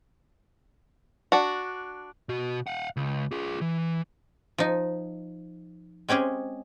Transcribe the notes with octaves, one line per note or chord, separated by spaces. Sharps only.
D4 F#4
B2 F#4
F5 F#5
C#2
F4 G#4
E3
F3 D#4
G#3 C4 C#4 G4 G#4